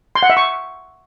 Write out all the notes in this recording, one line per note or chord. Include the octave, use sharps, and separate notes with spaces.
C6
F#5
E5
C#6